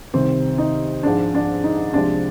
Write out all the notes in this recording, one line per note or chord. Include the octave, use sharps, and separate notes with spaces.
C2 C3 D#3 G3 C4
D#4
G#2 F3 G#3 D4
D4
D#4
C2 C3 F3 G#3 D4